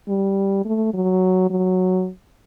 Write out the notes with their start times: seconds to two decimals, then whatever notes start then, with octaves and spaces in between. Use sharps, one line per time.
0.08 G3
0.65 A3
0.94 F#3
1.50 F#3